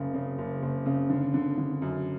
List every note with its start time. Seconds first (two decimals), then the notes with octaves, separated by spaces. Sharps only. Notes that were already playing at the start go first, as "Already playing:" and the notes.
Already playing: F#1 C#3
0.14 C#3
0.38 F#1
0.62 F#1
0.86 C#3
1.10 D3
1.34 D3
1.58 D3
1.82 F#2